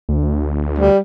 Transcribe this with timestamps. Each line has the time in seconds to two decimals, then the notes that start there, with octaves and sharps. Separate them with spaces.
0.09 D2
0.79 G3